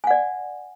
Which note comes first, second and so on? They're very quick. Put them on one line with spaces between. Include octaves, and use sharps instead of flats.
G#5 F#5 D5